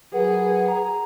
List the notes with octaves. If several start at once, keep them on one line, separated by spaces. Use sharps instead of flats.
F#3 G#4 A#4 B4 F#5
A#5